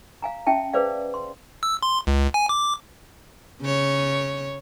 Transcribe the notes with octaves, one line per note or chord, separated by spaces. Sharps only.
F5 G#5 A#5
C#4 E5 G5 A5
G#4 B4 C5 D5 F5
C6
E6
C6
C#2
G#5
D6
C#3 C#5